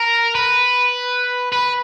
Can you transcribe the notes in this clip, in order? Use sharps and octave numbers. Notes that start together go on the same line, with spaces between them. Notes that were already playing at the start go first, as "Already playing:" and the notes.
Already playing: A#4
B4
B4